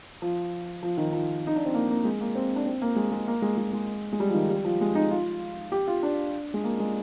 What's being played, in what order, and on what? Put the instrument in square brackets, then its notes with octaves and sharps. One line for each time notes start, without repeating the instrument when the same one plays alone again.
[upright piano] F3
F3
D#3
F3
D#4
D4
C4
A#3
A#3
G#3
A#3
C4
D4
C4
A#3
G#3
G#3
A#3
G#3
G#3
G#3
G#3
G3
F3
D#3
G3
F3
G#3
D#4
F4
G4
F4
D4
G#3
A#3
G#3